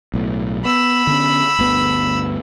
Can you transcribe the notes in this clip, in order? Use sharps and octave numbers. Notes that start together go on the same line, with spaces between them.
B1 A2
B3 B5 E6
D3 B3 C#4
G1 D2 B3